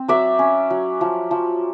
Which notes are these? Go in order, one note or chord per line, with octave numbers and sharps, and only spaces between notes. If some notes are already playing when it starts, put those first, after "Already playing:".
Already playing: C4
F#3 D5 E5
C#4
F#3
F3
F3